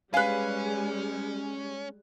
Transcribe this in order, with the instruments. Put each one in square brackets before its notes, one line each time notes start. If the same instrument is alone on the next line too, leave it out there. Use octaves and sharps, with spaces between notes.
[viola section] G3 G#3 [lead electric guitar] C#4 [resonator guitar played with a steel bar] B4 F5 [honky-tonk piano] G#5 F#6